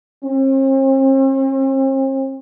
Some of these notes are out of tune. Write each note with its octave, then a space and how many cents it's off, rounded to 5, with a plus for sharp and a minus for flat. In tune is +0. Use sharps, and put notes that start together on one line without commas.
C4 +45